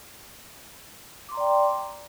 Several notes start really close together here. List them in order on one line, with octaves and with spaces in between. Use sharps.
D6 C6 A#5 D5 G5